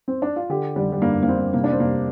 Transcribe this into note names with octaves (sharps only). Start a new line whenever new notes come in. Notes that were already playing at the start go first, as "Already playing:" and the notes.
C4
D4
F4
D3 G4
D3 G3
G3
G2 A#3
A#3
G2 C4
C3 A#3
D4
C4
C3 A#3